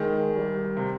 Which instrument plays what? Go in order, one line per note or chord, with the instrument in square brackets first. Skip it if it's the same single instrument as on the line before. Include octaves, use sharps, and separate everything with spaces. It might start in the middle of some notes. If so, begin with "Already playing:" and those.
Already playing: [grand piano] D#3 [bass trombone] G#3
[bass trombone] G3
[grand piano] C3